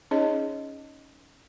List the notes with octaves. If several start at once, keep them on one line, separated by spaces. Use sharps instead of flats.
C#4 D#4 G#4 C#5 D#5